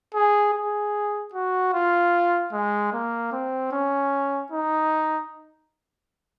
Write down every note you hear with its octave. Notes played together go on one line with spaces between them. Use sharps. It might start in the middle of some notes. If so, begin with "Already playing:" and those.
G#4
G#4
F#4
F4
G#3
A#3
C4
C#4
D#4